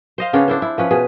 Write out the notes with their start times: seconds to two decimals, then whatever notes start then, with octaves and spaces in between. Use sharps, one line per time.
0.18 C5 D#5 F5
0.33 C#3 B3 C#4 D4
0.48 D4 E4 C5
0.62 E4
0.78 F3 C#4 B4
0.91 B2 G#4